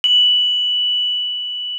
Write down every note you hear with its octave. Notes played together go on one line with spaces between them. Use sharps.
F#7